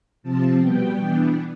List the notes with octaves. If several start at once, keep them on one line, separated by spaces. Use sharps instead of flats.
C3 F3 C4 A5
B2 G3 B3 G5
E3 B3 D4